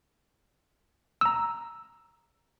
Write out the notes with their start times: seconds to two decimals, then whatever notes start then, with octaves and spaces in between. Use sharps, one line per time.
1.21 A#5 E6